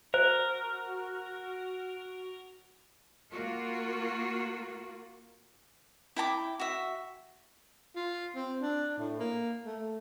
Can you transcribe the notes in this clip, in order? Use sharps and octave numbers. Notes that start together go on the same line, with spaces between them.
F#4 A#4 C5
A#3 F4 F#4
E4 G5 A5 D6
F#4 E5
F4
C4
D4
A2
A#3
A3